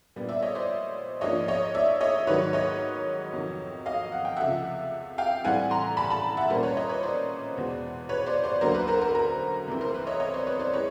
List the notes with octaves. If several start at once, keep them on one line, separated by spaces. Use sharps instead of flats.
A#2 G3 B3 D4
D5 E5
C#5 D#5
C5 D5
G#2 F3 A#3 D4 C#5 D#5
C#5 D#5
D5 E5
C#5 D#5
G#2 D#3 F#3 B4 C#5
C#5 D#5
F2 C3 D#3 F#3
D#5 F5
F#5
G5
C#2 C3 F3 A3 E5 F#5
F5 G5
A2 E3 G3 C4 F#5 G#5
A#5 C6
A5 B5
A5 B5
E5 F#5
A#2 G3 A#3 C#4 A#4 C5
B4 C#5
C#5 D#5
B4 C#5
C5 D5
E2 B2 G#3 B3
B4 C#5
C5 D5
C5 D5
D2 D3 F#3 A#3 A#4 C5
B4
A#4 C5
A#4
A#4
C2 C3 E3 A3 C4
A#4 C5
B4
C#5 D#5
C#5 D#5
C5 D5
B4 C#5
C5 D5
E3 G#3 B4 C#5